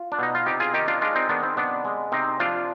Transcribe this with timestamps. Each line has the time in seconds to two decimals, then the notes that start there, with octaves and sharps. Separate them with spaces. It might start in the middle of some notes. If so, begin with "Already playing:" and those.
Already playing: F4
0.12 D4
0.19 B2 D#4
0.35 F4
0.46 C3 D#4 G4
0.60 F4 G#4
0.74 D#3 D#4 G4
0.88 D4 F4
1.02 G#3 D4 F4
1.15 C4 D#4
1.29 D#3 B3 D4
1.43 C4
1.57 C3 B3 D4
1.85 G#3
2.12 C3 C4 D#4
2.40 F3 D4 F4